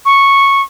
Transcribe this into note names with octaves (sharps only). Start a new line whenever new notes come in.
C#6